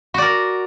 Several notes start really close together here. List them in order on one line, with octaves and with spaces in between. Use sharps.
F#4 D5 A#4